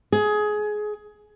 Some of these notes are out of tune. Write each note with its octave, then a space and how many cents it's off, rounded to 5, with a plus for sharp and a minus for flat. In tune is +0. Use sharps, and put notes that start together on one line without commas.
G#4 +20